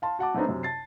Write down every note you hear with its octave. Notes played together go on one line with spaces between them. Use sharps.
F5 A5 C6
F#4 F#5 A5 D6
F#3 A3 B3 C4 D4 D#4
F#2 C3
A5 A6 C7